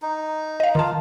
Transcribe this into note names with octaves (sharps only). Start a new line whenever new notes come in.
D#4
D#5 F5
D#3 F4 A5